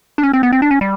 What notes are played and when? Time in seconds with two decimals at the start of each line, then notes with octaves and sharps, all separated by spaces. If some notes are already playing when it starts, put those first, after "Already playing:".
0.18 D4
0.23 C#4
0.33 C4
0.43 B3
0.53 C4
0.62 D4
0.71 C#4
0.81 G3